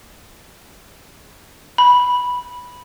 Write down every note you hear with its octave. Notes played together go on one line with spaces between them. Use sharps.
B5